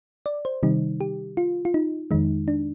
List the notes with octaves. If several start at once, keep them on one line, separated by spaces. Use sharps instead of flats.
D5
C5
C3 D#3 G3 D#4
G4
F4
F4
D#4
F2 D#3 G#3 D#4
D4